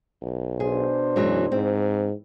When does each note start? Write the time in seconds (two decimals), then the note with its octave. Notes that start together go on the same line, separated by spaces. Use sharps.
0.22 B1
0.60 B2 D4 G#4 C5
1.16 F#2 E3 F#3 G#3
1.52 G#2 C4